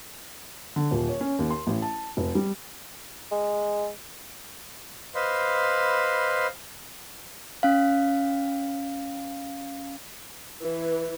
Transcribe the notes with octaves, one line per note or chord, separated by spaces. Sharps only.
D3
D#1
C#5
C#4
D#2
C6
A1
A5
F1
G3
G#3
B4 C5 D#5 F5 B5 C6
C#4 F5
E3